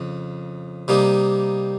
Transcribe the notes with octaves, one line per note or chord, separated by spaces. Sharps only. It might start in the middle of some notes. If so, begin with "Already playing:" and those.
Already playing: F2 C#3
C3 G3 A#3 D#4